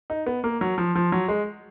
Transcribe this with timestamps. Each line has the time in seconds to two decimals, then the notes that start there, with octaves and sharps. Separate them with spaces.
0.10 D#4
0.26 B3
0.44 A#3
0.61 F#3
0.78 F3
0.95 F3
1.12 F#3
1.28 G#3